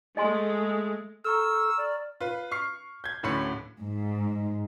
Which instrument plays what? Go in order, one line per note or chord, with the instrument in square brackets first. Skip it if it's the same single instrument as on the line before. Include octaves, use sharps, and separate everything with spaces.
[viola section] G#3 A3 [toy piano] D#5 G#5 C6
[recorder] A4 [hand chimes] A#5 C#6 F6 [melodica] E6
[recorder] D5
[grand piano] F4 B4
C#6 F6 C7
G6 G#6
D1 A2 D3 C#4 B5 C#7
[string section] G#2